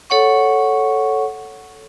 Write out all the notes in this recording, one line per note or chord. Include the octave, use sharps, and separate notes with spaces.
A4 C#5 F#5 C#6